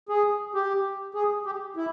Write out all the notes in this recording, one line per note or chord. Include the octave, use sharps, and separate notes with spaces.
G#4
G4
G#4
G4
E4